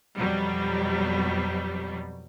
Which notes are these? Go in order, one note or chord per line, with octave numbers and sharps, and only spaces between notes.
F2 B2 F#3 G3